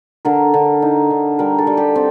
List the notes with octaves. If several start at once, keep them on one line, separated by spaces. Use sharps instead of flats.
D3 A#4
D3
D#4
D3
G3 A#4
A4
G3
G4
C4